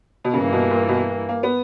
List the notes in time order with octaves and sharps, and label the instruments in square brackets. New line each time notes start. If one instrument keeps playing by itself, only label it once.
[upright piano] B2
[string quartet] G2 E3 A#3 [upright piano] C#3
[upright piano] B2
A#2
B2
A#3
B3